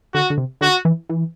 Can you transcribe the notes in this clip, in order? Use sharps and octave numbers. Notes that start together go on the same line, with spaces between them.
D3 F#4
D3
C3
D3 F#4
E3
E3